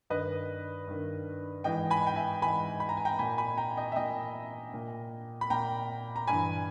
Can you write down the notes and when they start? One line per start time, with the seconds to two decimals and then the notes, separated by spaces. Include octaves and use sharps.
0.10 G2 D#3 B4 D#5
0.87 G2 D#3
1.64 G#2 E3 D#5 G5
1.90 G#5 B5
2.07 G5
2.16 E5 G#5
2.42 G#2 E3 G#5 B5
2.80 B5
2.89 A#5
2.97 G#5
3.05 G5 A#5
3.19 A#2 G#5 B5
3.38 G#5 B5
3.57 G5 A#5
3.77 D#5 G5
3.92 E5
3.96 A#2 D#5 G5
4.73 A#2
5.41 B5
5.50 A#2 G5 A#5
6.16 A#5
6.27 G2 E3 G#5 B5